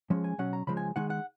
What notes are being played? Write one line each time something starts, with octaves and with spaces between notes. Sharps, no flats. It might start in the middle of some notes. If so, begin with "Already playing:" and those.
F3 G#3 C#4
G#5
B2 F#3 C#4 F#5
A#5
C#3 F3 G#3 B5
G#5
D#3 G#3 D#4 F#5
F#5